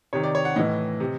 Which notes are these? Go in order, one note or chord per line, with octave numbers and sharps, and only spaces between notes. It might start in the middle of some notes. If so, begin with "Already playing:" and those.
C3 D#3 C#5
D5
C#5
F#5
A2 E3 D#5
C3